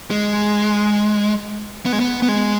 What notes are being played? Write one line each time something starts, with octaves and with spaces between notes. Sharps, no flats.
G#3
B3
G#3
B3
B3
G#3